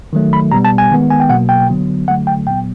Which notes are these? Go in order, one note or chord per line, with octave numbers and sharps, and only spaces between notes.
D#3 F#3 A3
B5
B2 G3 B3 A#5
A5
G#5
D#3 G#3 B3
G#5
G5
B2 F#3 A#3 F#5
G5
D3 F#3 B3
D3 F#3 A3 F#5
G5
A#2 F#3 B3 G5